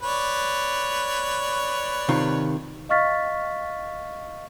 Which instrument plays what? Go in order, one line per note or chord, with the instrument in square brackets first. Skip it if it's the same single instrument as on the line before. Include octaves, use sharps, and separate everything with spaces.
[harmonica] B4 C#5 D5
[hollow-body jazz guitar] C3 D#3 F4
[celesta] D#5 F5 C#6 F6 A6 B6